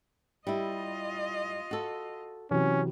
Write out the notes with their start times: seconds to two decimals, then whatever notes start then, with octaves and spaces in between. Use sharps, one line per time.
0.47 G3 E4 F4 D#5
1.71 F#4 A4
2.51 C3 E3 F#3 C#4